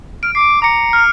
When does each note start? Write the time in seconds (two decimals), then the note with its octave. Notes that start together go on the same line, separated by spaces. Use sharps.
0.23 F6 D7
0.35 D6 C7
0.62 A#5 D6 C#7
0.93 F6